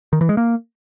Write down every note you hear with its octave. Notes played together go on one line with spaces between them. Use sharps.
D#3
E3
G#3
A#3